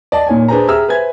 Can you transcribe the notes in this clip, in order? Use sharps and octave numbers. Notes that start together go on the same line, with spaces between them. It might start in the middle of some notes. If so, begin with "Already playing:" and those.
D5 D#5 A5
A#2 D#4 C#5 G#5
D4 G#4 B4 C5 G#5 A#5
G4 G#4 E5 A#5 E6 F6
B4 C5 E5 G#5 G#6